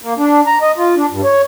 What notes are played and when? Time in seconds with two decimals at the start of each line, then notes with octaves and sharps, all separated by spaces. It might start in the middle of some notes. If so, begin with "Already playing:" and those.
0.02 A#3
0.18 D4
0.47 A#5
0.62 D#5
0.77 F4
0.97 D4
1.11 G2
1.24 C#5